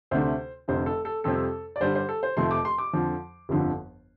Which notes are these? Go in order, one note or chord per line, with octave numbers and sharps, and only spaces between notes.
D2 C3 A3 D4 C5
F1 F2 D3 C5
A4
A4
F2 C3 G3 C4 A4
D5
G2 D3 G3 D4 C5
C5
A4
C5
F1 F2 F3 A3 C6
D6
C6
D6
F2 D3 F3
G1 F2 D3 F3